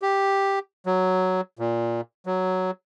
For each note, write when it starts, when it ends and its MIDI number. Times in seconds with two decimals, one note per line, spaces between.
0.02 0.59 67
0.86 1.41 54
1.59 2.01 46
2.26 2.71 54